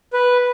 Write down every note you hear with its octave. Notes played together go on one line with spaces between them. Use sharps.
B4